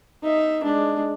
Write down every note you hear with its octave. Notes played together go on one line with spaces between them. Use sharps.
D#4 E5
G#3 D4